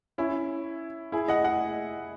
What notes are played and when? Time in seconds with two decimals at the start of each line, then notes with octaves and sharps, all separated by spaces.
0.18 C#4 E4
1.12 E4 G#4
1.28 D#5 F#5
1.44 D#5 F#5